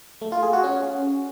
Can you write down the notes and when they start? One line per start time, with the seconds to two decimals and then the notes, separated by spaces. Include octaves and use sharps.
0.21 A3
0.32 F4
0.43 G#4
0.53 F#4
0.64 C#4